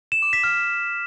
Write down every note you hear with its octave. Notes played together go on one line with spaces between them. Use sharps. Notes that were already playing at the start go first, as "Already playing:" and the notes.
E7
D6
B6
F6